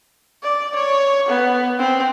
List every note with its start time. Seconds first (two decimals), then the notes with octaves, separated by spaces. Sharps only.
0.43 D5
0.75 C#5
1.29 B3
1.79 C4